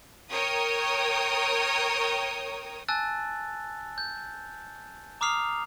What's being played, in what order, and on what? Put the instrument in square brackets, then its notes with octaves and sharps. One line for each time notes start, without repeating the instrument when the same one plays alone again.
[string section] A#4 C#5 G5 D#6
[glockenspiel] G#5 A5 E6 F#6 A6
G6
A#5 D6 D#6 F6 C7 F7